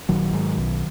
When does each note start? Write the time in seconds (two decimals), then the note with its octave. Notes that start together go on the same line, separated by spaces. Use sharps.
0.09 A#1 D#3 F#3
0.33 G#2
0.57 B1